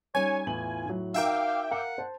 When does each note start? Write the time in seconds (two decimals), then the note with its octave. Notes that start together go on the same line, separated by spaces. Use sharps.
0.15 G3 C#4 D#4 C#5 G#5
0.47 E2 A2 F4 F#7
0.86 A2 F#3
1.14 D#4 F#4 A#4 E5 F5 G5 D6
1.71 A#4 F5 F#5
1.98 C5 A5